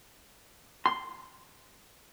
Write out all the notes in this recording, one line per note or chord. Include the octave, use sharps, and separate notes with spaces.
C6